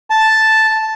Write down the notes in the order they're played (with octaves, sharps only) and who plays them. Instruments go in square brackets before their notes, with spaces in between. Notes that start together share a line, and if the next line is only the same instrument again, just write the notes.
[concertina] A5